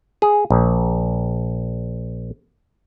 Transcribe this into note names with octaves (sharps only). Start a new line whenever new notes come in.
G#4
A#1